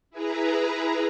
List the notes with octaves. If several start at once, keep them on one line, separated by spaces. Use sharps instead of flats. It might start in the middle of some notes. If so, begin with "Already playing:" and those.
E4 G#4 B4 A#5